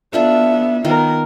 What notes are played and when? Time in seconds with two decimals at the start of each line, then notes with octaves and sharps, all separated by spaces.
0.13 B3 D4 F4 A4 E5
0.85 D#3 B3 F4 A#4